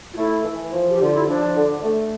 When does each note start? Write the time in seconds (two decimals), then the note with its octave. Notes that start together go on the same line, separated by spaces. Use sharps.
0.14 F4
0.17 A3 E4
0.45 E3
0.73 F3
0.90 G4
1.00 D3 F4
1.15 E4
1.27 F3 D4
1.56 D3
1.83 A3